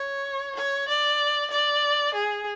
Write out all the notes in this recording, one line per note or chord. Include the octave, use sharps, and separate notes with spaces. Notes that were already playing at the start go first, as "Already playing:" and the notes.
Already playing: C#5
C#5
D5
D5
G#4